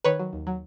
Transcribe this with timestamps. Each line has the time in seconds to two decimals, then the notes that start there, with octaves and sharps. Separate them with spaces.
0.04 D#3 B4 C#5
0.19 F#3
0.33 D#2
0.47 F#3